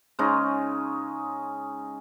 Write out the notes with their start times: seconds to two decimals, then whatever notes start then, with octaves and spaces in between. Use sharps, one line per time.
0.19 C#3 G#3 C#4 D#4